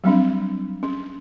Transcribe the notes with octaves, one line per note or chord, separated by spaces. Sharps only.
F#3 G3 C4 D4
C#4